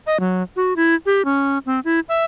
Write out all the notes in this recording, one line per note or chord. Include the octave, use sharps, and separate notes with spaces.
D#5
F#3
F#4
E4
G4
C#4
C4
E4
E5